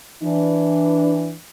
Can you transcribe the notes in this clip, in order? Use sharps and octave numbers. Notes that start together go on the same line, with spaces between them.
E3 D4